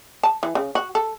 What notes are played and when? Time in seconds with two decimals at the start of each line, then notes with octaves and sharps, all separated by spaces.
0.23 A5
0.43 E3
0.55 C#3
0.75 F#4
0.95 A4